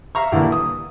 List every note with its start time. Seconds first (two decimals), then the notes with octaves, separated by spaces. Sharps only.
0.15 E5 F5 A#5 C#6
0.32 G2 A#2 D3 E3 E4
0.52 D#6